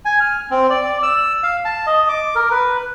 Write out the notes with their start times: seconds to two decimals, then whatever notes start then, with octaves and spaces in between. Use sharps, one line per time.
0.05 G#5
0.20 F6
0.51 C4
0.70 D5
1.03 E6
1.43 F5
1.65 A5
1.87 D#5
2.09 D6
2.35 A#4
2.51 B4